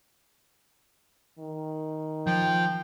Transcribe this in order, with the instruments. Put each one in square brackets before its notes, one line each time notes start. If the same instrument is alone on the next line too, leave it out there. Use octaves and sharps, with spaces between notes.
[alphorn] D#3
[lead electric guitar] F3 [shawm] G5